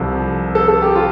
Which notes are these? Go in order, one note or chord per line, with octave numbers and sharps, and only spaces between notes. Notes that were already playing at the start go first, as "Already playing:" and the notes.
Already playing: C2 C3 F3 A4
A4
A4
G4
F4